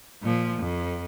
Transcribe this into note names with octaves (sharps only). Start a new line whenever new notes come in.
A#2 F3
F2